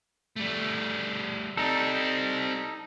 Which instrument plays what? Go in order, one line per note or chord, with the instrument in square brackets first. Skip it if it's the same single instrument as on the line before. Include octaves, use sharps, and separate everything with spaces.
[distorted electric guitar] G3 A3
[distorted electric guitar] G3 C4 [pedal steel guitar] D#4 A4